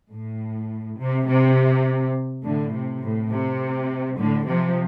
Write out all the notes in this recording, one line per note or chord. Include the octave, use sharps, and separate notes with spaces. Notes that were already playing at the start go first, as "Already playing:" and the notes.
A2
C3
C3
A2 D3
C3
A2
C3
A2 D3
C3 F3